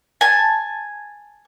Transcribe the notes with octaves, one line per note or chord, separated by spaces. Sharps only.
G#5 A5